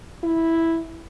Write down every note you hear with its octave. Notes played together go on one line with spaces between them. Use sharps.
E4